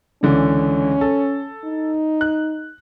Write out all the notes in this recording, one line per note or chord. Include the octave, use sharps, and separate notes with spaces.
C#2 D3 E3 C#4
A4
D#4
F#6